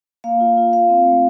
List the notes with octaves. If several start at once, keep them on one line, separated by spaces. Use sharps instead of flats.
A#3 F5
F4
F4
F4 F5
C4
A3